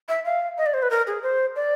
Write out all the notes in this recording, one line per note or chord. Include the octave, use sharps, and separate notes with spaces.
E5
F5
D#5
D5
C5
B4
A#4
G#4
C5
D5